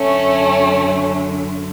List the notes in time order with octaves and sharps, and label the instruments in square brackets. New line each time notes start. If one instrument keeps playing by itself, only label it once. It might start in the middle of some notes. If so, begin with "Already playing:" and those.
Already playing: [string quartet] F#2 D3 A3 C#4